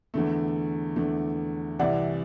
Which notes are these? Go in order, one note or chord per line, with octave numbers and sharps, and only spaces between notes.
E2 D3 A3
E2 D3 A3
C2 C3 E3 D5 F#5